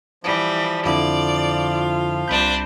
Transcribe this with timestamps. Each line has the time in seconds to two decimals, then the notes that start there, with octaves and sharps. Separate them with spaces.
0.23 E3 F3 G3
0.85 F2 D3 E4 F4 D5
2.28 C2 C3 D4 C5 B5 G6